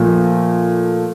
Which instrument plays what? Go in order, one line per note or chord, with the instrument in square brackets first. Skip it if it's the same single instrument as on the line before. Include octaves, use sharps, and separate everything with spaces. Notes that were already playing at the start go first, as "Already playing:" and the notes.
Already playing: [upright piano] A#2 F3 A3